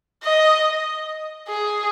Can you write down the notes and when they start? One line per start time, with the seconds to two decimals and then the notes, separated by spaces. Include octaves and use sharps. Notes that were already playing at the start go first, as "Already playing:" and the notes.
0.23 D#5
1.48 G#4